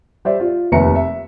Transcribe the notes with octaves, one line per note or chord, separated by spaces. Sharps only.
G3 C5 D5 E5
F4
F1 D#2 B4 E5 A#5 C#7
E5